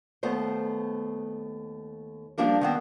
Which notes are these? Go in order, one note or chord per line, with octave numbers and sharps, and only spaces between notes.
D#2 A3 B3 C5
F3 G3 A#3 D4 A#4
D#3 B3 C4